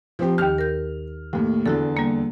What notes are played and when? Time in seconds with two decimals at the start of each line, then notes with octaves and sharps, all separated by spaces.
0.19 F3 C4 G4
0.38 D#2 D#3 G4 F6
0.58 A#4 G6
1.33 D#2 A2
1.66 E2 D3 E4 F#4 A4
1.97 G3 A#3